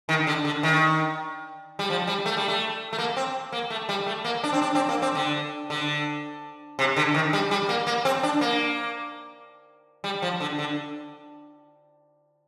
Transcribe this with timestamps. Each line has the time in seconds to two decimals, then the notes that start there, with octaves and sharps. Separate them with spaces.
0.09 D#3
0.27 D3
0.45 D3
0.63 D#3
1.79 G3
1.90 F3
2.07 G3
2.26 A3
2.37 G3
2.48 A3
2.93 A3
2.98 A#3
3.17 C4
3.52 A#3
3.70 A3
3.89 G3
4.06 A3
4.24 A#3
4.44 D4
4.53 C4
4.62 D4
4.75 C4
4.89 A#3
5.02 C4
5.15 D3
5.70 D3
6.79 C3
6.97 D3
7.14 D#3
7.33 G3
7.51 G3
7.69 A#3
7.87 A#3
8.05 C4
8.23 D4
8.41 A#3
10.04 G3
10.22 F3
10.40 D3
10.59 D3